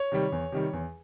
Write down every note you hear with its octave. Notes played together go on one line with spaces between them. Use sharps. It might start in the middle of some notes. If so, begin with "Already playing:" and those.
Already playing: C#5
C3 D#3 G3
E2
C3 D#3 G3
E2